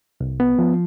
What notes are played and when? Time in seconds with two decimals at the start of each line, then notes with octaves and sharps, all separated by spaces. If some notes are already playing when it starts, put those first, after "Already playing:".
0.21 C2
0.40 B3
0.59 F3